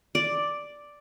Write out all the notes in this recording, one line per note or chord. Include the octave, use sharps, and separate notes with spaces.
D5